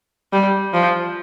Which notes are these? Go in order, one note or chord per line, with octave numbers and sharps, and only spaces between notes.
G3
F3